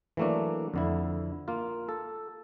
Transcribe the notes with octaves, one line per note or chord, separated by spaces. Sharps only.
E3 F#3 A3 A#3 D4
F2 D3 E4
A#3 F4
A4